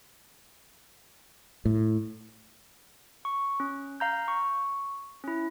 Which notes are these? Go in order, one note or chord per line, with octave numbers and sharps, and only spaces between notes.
A2
C#6
C#4
F5 A#5 G6
C#6
C#4 E4